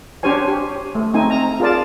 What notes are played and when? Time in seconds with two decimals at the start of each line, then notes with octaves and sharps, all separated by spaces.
0.23 C#4 D4 G4 C5 C#5 G#5
0.48 G4
0.95 A3
1.14 A3 C4 D#4 G#5
1.30 A#5
1.60 F4 G#4 A#4 D5 A5